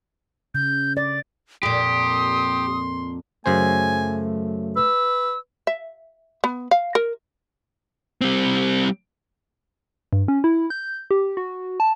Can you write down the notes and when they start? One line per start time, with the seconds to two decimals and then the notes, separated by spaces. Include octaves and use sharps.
0.55 C#3 G6
0.97 D5 A6
1.63 F2 A#2 G4 C6 D#6
3.46 F#2 C#3 A3 C5 G#5
4.76 B4 E6
5.67 E5
6.44 B3
6.71 F5
6.95 A#4
8.21 G3 C4
10.13 G2
10.28 C#4
10.44 E4
10.70 G6
11.11 G4
11.37 F#4
11.80 A5